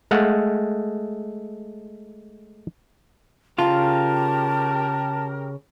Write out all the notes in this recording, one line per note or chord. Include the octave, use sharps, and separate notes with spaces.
G#3 A3 F5 F#5
C#3 F4 G4 A#4 F5 A5